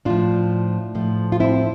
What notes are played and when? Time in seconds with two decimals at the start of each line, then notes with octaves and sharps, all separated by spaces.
0.05 A2 F3 D4 F4
0.95 A2 F3
1.32 F4
1.40 C4 E4